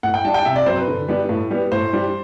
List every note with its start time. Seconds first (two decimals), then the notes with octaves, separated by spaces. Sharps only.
0.03 A2 F#5
0.14 G5
0.24 G3 D4 A5
0.34 G5
0.45 C3 E5
0.56 D5
0.66 F#3 C4 C5
0.77 B4
0.88 D3
1.08 G3 B3 D4
1.29 A2
1.51 G3 B3
1.72 A2 C5
1.93 G3 D4